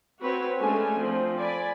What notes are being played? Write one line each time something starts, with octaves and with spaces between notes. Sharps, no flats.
C4 F#4 B4 C#5
G#3 A3 C#4 D4 A4 G#5
F3 C4
D5 G#5 B5